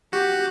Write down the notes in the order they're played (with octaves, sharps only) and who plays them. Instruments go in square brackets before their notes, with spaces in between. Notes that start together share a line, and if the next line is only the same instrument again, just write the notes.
[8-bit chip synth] F#4 [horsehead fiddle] G4